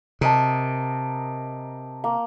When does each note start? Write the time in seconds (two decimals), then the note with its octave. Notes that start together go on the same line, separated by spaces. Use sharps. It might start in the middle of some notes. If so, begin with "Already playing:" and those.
0.21 C3 A#4 D#5 A5
2.04 A#3